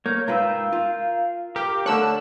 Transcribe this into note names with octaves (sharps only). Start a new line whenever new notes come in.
A#3 C#5 G6
G#2 F4 A#4 B4 F5 G5 E6
F4
G4 A#4 F5
D3 A3 C#5 A5 E6 F#6